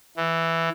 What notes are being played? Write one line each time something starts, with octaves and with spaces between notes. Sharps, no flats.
E3